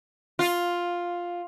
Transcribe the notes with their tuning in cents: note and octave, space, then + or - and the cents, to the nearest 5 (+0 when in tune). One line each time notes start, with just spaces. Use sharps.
F4 +5